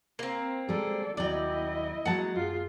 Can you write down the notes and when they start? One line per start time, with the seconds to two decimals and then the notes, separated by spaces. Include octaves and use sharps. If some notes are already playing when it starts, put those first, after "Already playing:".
0.19 A#3 C4
0.69 G3 G#3 G#4 A4 D5
1.17 D#2 F#3 E4 D5 D#5 G5
2.05 F#3 G#3 A#3 F#5 A5
2.35 F#2 F4 G#4